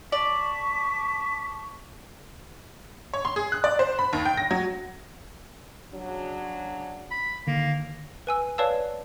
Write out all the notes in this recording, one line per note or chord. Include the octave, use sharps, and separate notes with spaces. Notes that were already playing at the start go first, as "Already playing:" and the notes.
D5 A5 C#6 D6 B6
C#5
C6
G#4
F#6
D5
C5
B5
D#2
G5
A#6
F#3
C#3 F#3 D4
B5
D3 D#3 A#3
B4 G#5 E6
B4 C#5 D5 F5 A5 E6